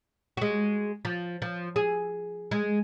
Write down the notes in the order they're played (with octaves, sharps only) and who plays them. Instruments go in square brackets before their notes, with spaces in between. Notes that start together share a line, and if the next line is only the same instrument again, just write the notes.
[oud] G#3 F#4
F3
F3
G#4
G#3